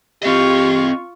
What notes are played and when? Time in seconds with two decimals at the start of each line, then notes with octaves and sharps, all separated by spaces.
0.23 C4 F4 G4 D#5 C#6